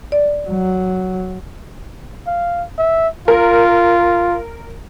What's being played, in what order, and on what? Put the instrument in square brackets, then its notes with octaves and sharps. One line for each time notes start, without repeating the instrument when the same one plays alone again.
[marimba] D5
[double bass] F#3
[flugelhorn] F5
E5
[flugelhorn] F4 [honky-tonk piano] A#4